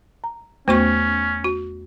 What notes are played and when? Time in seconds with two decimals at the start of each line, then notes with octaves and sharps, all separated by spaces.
0.24 A#5
0.68 E2 A3 B3 C#4 F#4 C5 C#6
1.44 F#4